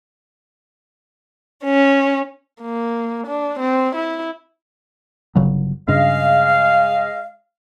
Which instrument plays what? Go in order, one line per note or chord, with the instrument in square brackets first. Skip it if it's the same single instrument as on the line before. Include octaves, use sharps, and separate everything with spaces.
[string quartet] C#4
[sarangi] A#3
D4
C4
E4
[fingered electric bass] G1 C#3 F#3
[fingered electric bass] G2 C#3 [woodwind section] G#3 D#5 F5